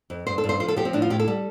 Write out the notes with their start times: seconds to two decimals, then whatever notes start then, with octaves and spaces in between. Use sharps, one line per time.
0.10 F2
0.27 G2 C5
0.38 A4
0.44 G2
0.49 C5
0.60 F3 C5
0.68 A4
0.77 F3 G4
0.85 C4
0.93 A2 D4
1.02 F4
1.10 A2 G4
1.20 A4
1.28 G3